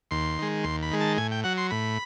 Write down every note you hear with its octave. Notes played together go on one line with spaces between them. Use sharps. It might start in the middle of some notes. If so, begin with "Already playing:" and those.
D#2 C6
D#3 G#3
D#2 C6
B5
D#3 G#3
A5
A2 G#5
G5
F#3 F#5
C6
A2 B5